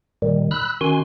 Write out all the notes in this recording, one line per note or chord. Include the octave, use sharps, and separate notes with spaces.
A#2 D#3 G3
B5 E6 F#6
D#3 C#4 F#4 G#5 C6